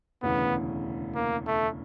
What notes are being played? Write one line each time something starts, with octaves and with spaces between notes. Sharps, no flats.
E1 D2 C#3 E3 B3
A#3
A3